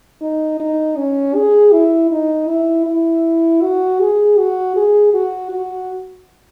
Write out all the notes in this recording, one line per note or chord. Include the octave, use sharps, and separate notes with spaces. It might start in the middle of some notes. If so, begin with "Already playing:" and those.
D#4
D#4
C#4
G#4
E4
D#4
E4
E4
F#4
G#4
F#4
G#4
F#4
F#4